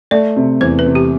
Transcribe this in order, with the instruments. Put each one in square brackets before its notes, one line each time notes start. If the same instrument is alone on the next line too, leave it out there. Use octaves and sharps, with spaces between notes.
[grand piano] A3 [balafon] D5
[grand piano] C3
[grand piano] E2 [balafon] C5
[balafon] B4
[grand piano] C3
[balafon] G4